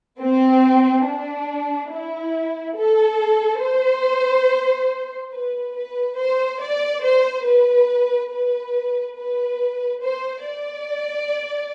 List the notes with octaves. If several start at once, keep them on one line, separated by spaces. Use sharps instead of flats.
C4
D4
E4
A4
C5
B4
B4
C5
D5
C5
B4
B4
B4
C5
D5